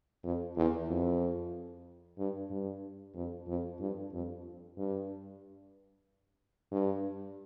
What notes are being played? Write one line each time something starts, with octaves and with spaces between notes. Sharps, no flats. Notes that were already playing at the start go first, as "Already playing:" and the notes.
F2
E2
F2
G2
G2
F2
F2
G2
F2
G2
G2